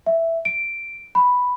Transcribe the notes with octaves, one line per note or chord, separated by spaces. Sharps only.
E5
D7
B5